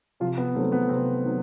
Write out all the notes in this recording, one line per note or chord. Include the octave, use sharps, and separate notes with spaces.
C3 F3 F4
B3
D#3 F#3 A3 C4
B3
C3 C4
D#3 F#3